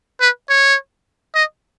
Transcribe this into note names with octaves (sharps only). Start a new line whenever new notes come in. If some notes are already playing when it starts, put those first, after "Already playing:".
B4
C#5
D#5